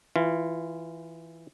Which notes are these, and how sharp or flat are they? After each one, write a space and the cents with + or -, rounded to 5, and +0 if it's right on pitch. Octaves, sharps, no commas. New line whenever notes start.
E3 +0 F4 -15